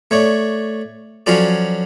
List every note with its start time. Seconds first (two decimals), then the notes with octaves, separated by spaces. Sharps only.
0.11 A3 C#5 D5
1.26 F3 F#3 C#4 F4 A4 D5